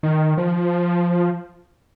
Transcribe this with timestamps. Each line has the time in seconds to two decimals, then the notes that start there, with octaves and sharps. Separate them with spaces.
0.03 D#3
0.37 F3